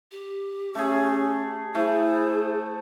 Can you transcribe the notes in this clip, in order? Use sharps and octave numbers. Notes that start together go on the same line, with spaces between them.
G4
A3 C#4 G#4
A3 E4 G#4 C5